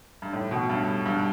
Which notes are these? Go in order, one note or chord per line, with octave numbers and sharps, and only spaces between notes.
G2
A2
B2
G2
G2